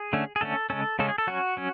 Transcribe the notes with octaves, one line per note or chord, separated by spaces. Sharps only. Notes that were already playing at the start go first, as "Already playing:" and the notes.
Already playing: G#4
D3 A3 C#4
G#4
D3 A3 C#4 A4
C#3 G#3 C#4 A4
C#3 G#3 C#4 A4
G#4
A4
F#3 C#4 F#4
F#3 C#4